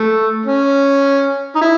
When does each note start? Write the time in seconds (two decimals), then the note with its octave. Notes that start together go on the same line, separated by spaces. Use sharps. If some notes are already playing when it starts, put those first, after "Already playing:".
Already playing: A3
0.45 C#4
1.55 D#4
1.61 E4